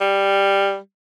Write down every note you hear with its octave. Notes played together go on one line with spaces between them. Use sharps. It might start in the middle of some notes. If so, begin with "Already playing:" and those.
G3